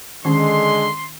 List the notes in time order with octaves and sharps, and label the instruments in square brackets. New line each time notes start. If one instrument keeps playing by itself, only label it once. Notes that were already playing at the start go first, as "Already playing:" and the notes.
[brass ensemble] D3 G#3 [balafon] D#3 C#4 [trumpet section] C6